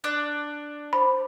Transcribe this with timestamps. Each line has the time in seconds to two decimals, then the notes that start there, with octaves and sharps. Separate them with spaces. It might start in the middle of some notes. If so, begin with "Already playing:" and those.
0.04 D4 D5 F#6
0.93 C5 B5